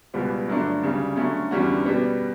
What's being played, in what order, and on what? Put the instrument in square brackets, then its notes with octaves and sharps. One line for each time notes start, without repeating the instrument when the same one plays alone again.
[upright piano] C#2 B2 G3 B3 F#4
G2 D3 F#3 A3 D4
D2 C#3 G3
D3 F#3 A3 C#4
E2 D3 G3 C#4 F#4
B2 G3 B3